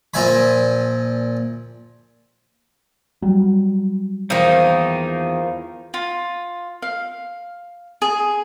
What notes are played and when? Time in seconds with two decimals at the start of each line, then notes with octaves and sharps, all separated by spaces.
0.14 A#2 F3 E5 G#5 B5
3.22 F#3 G3
4.30 E2 D#3 F3 A#3 D#4
5.94 F4
6.82 F5
8.02 G#4